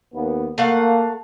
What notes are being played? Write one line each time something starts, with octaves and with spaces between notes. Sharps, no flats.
D#2 B3
A3 A#3 F5 F#5